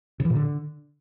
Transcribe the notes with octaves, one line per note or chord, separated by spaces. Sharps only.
C#3
E3
A#2
D3